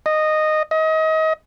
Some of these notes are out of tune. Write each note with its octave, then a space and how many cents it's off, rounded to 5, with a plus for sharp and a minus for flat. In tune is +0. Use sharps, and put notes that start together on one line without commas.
D#5 -10
D#5 +30